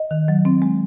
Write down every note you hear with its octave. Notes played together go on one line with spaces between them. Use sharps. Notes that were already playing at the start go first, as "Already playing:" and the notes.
Already playing: D#5
D#3
F#3
C4
G#3